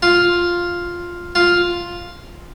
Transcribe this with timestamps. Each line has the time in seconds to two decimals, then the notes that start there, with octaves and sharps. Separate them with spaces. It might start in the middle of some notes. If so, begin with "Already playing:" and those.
0.02 F4
1.35 F4